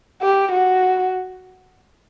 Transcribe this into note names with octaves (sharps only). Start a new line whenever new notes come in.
G4
F#4